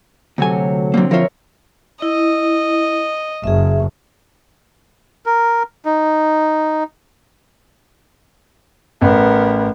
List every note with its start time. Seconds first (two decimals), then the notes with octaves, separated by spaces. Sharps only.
0.38 D2 C3 F#3 A4 G#5
0.94 D3 F#3 A#3 C4
1.11 F3 F4 A#4 C#5 E5
2.02 E4 D#5
3.44 F#1 G#4 E5
5.26 A#4
5.85 D#4
9.02 A1 B3 A#4